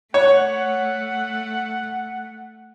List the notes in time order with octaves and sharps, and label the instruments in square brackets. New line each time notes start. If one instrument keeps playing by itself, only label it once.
[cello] A3 [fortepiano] C#5 [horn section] F#5